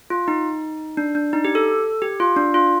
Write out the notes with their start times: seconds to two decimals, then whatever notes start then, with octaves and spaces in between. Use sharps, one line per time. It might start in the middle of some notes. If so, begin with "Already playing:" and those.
0.10 F4
0.28 D#4
0.97 D4
1.15 D4
1.33 D#4
1.45 G4
1.55 A4
2.02 G4
2.20 F4
2.37 D4
2.54 F4